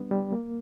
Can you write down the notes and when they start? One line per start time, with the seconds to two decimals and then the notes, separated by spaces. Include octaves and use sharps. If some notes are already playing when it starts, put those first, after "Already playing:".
Already playing: G3 B3 D4
0.11 G3
0.32 A#3